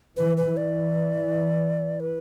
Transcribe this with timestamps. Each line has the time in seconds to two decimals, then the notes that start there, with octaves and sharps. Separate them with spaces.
0.17 E3 B4
0.37 B4
0.47 E3
0.57 D5
2.00 B4